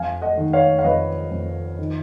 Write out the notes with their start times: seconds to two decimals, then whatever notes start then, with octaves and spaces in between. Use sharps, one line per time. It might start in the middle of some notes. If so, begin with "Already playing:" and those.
Already playing: F2 F5 G#5
0.22 D#5 F#5
0.37 D#3
0.53 C#5 F5
0.79 F5
0.84 F2 B4 D#5
1.31 F2
1.79 D#3